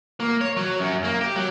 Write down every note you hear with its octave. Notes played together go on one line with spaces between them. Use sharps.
A#3
C#5
F#3
F#2
A#3
G4
F#3